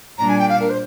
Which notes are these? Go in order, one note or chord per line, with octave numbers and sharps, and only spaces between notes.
A#2 G3 D4 A#5
G#5
G5
F5
A#4
C5